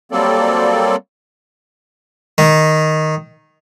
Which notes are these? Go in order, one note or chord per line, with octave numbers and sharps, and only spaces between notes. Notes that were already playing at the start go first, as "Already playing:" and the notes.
F#3 G3 A#3 C4 A4 D5
D#3